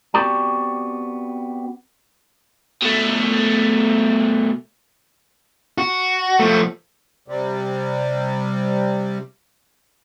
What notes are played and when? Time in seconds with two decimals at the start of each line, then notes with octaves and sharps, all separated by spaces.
0.14 B3 C4 F#4 G4 D5 A5
2.82 B2 A3
5.78 F#4
6.39 F3 A3
7.28 C3 G3